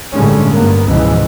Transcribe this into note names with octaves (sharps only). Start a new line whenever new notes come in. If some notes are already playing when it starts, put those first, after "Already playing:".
G1 A2 D3 G3 G#3 C#4
G2 A#3 B3
C#2 G#2 B2 E3 F3